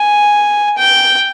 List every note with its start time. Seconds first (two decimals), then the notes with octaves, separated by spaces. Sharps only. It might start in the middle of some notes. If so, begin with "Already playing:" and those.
Already playing: G#5
0.77 G5